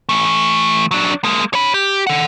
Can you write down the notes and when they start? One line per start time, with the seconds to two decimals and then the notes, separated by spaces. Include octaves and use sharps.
0.09 E3 A3
0.91 F#3 D4
1.24 G#3 A#3
1.54 C#5 B5
1.74 G4
2.07 A4 F#5